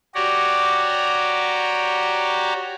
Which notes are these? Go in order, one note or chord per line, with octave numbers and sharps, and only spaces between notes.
F#4 G4 C#5 D5 A#5